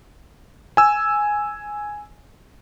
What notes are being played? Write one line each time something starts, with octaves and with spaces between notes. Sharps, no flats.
G#5 E6